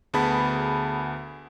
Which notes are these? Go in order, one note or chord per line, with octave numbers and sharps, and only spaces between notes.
D2 B3 G#4 A5 B5